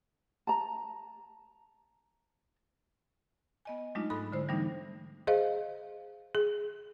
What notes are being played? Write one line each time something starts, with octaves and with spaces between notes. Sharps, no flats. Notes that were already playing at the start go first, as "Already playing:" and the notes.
A5 A#5
B3 D#5 G#5
F#3 G#3 A3 D4 D#4 F4
G#2 A4 B5 D#6 F#6
D3 G#3 E4 C5
E3 G3 A3 B3 D4 D#4
G#4 C5 D#5 F5
G#4